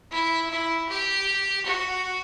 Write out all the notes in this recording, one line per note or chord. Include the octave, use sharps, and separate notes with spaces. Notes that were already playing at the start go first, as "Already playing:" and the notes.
E4
E4
G4
F#4